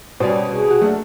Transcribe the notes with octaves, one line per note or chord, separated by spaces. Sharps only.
B2 G3 C#4 C5 D5
C2 G#4
F#4 G4
F#3 A3 A#3 D4